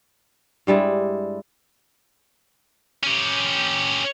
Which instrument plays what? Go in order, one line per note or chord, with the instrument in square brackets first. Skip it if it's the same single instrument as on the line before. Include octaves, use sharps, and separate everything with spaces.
[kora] G2 G3 G#3 E4
[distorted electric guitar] C#4 G4